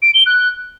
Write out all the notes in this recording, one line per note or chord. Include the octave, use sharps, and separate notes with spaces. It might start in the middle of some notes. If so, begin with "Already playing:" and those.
D7
G7
F#6